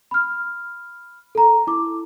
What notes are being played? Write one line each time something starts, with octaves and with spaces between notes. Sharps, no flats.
B5 F6
A4 A#5
E4 D6